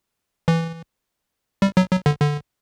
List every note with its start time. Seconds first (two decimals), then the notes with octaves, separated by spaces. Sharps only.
0.48 E3
1.62 G3
1.77 F#3
1.91 F#3
2.06 D3
2.20 D3